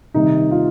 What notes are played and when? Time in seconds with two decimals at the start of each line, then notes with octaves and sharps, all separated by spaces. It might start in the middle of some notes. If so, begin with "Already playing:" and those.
0.14 C3 D#3 G3 D#4
0.51 F4